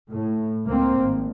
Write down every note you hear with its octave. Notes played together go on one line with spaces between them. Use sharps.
A2
C#2 A#3 C4
G#1